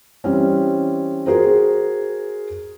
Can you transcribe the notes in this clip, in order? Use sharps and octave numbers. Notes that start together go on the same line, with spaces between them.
E3 G3 C4 C#4
F#4 G#4 A#4 C5